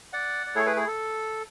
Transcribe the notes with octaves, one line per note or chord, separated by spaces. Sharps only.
D5 F#5
D5
A3 E4 G#4 A4 C#5
G#4 B4
G#4
A4